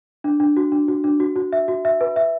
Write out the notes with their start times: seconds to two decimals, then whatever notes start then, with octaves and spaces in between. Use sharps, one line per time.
0.24 D4
0.40 D4
0.57 F#4
0.72 D4
0.88 F#4
1.04 D4
1.20 F#4
1.36 F#4
1.53 E5
1.68 F#4
1.85 E5
2.01 B4
2.16 E5